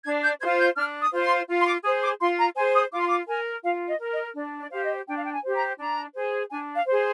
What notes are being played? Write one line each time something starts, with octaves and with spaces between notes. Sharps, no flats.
D4 G#6
G6
F4 C5 G#6
G6
D4 F6
D#6
F4 C5
C6
F4
C6
D6
G#4 C5 D#6
D6
F4 C6
A#5
G#4 C5 G#5
D#6
F4 D6
C6
D6
A#4 G#5
F4 F5
D#5
A#4
D#5
D4 D5
D5
G4 C5 F5
D#5
D4 G5
F5
G5
G#5
G4 C5
A#5
D4 A#5
G#4 C5
D4 G#5
F5
C5
G#4